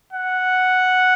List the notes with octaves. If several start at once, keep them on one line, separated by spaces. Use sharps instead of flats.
F#5